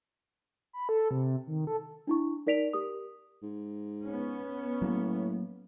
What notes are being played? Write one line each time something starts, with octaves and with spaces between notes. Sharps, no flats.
B5
A4
C3
D#3
A4
D4 E4 C#6
D#4 A#4 D5 B6 D7 F7
G4 A#4 D#6
G#2
B3 C#4
A2 F#3 A#3